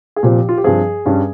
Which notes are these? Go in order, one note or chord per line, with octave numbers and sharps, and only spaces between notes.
G#4
A#2 F3 C4 G4
F4
G4
G2 F3 C4 G#4
G2 G3 C#4